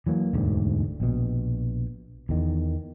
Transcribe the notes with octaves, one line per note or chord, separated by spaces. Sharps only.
E3 F#3 A#3
E1 D2 G#2
A#1 B2
E2 D#3